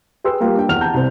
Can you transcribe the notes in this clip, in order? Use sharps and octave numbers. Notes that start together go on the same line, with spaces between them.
G#4 B4 G5 C6 E6
G3 A#3 F4 G4
D4 G5
E2 F#5 F6 F7
A5 A#5 G6
C2 C5